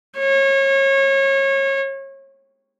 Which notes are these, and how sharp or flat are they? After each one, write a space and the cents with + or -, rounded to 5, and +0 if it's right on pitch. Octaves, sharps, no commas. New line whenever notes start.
C#5 -30